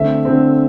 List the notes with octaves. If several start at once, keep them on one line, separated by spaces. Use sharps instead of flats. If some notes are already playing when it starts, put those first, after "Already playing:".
Already playing: D3 A3 C4 E5
D3 A3 C4